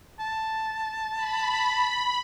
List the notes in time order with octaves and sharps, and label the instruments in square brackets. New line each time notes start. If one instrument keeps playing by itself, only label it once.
[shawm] A5
[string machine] B5